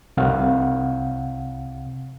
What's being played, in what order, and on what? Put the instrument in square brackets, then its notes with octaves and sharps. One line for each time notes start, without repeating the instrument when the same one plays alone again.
[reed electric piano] C2 C3 F5 F#5